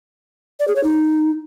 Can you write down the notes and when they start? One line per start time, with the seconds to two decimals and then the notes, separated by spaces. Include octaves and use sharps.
0.60 D5
0.68 G#4
0.76 C#5
0.84 D#4